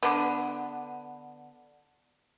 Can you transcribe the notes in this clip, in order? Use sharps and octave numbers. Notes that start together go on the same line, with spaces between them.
D3 B3